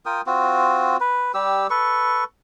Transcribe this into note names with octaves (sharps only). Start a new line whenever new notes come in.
F4 A#4 G5 D#6
C4 F4 F#4
B4
G3 G4 E6
A4 B4 C#6